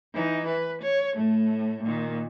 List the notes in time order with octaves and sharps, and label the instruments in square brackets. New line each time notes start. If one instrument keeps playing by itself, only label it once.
[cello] E3 D#4
B4
C#5
A2 A3
A#2 D#3